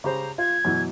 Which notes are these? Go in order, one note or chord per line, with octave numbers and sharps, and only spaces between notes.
C#3 G4 C5 A#5
F4 G#6
F#2 B2 E3